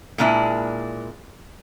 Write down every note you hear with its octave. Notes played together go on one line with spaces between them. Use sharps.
A#2 G#3 A#3 D4 E4